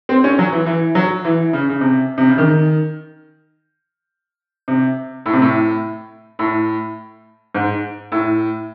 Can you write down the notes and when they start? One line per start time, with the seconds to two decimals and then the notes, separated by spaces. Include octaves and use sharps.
0.09 C4
0.24 C#4
0.39 F#3
0.52 E3
0.66 E3
0.95 F#3
1.25 E3
1.53 C#3
1.69 C#3
1.81 C3
2.18 C3
2.29 C#3
2.38 D#3
4.68 C3
5.26 A2
5.33 C3
5.42 A2
6.39 A2
7.55 G#2
8.12 A2